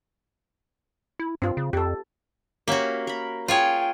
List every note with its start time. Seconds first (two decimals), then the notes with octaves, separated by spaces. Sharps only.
1.19 E4
1.42 G2 C4 F4
1.57 C#3
1.73 F2 G4 A4
2.68 A#3 C#4 F#4 G4 E5
3.07 A#4 B5
3.48 F4 G#4 C#5 G5